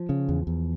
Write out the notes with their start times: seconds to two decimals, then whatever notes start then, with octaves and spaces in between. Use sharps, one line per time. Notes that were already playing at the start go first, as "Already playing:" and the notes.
Already playing: F3
0.09 C#3
0.29 E2
0.47 E2